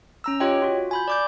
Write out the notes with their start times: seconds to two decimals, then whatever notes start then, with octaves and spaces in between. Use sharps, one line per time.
0.24 C#4 A#5 E6
0.40 F4 G4 C#5 D#5 G5
0.62 F4 F#4
0.91 G#5 B5 G6
1.08 D5 D6 G6